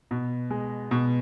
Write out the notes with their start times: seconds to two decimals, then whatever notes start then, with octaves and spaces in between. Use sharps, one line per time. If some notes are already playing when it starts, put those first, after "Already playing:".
0.11 B2
0.50 G#3
0.91 B2